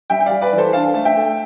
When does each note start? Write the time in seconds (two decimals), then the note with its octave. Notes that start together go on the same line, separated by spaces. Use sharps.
0.10 G3 E5 G5
0.21 G5
0.26 G3 D5 F5
0.41 B4 D5
0.53 E3
0.58 A4 C5
0.73 D4 F5 A5
0.94 A3 A5
1.05 E5 G5
1.17 A3